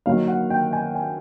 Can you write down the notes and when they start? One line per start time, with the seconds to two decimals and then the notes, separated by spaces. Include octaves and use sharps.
0.06 D#3 F#3 A#3 F5
0.28 F#5
0.50 G5
0.73 G#5
0.95 G#5